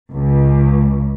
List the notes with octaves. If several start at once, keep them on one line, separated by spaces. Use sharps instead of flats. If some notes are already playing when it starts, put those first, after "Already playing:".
C#2